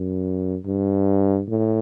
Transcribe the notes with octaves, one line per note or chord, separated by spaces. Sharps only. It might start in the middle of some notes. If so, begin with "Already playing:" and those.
Already playing: F#2
G2
A2